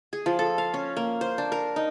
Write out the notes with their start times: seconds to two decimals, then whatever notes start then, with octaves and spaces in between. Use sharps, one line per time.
0.13 G#4
0.26 F3
0.39 A4
0.58 F5
0.74 C#4
0.97 A#3
1.21 C5
1.38 D4
1.52 A#4
1.76 D#4